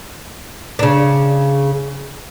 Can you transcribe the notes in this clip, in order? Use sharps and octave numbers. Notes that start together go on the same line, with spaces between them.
C#3 D4